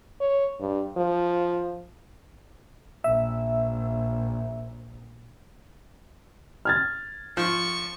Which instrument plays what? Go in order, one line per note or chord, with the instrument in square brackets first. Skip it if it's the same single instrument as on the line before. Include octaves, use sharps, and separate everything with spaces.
[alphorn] C#5
G2
F3
[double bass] A#1 [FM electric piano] E5
[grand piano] F6 G#6 A6
[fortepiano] F3 [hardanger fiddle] C#6